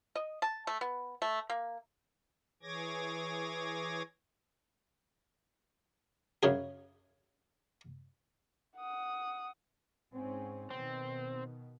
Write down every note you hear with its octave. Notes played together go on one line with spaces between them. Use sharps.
D#5
A5
A3
B3
A3
A#3
E3 G#4 C#5 D6 G#6 A#6
F#2 C#3 G#4
F#5 D#6
G#2 C4 C#4
B2 D#3 C4